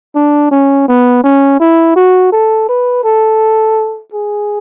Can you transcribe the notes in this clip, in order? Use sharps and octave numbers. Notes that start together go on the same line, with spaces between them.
D4
C#4
B3
C#4
E4
F#4
A4
B4
A4
G#4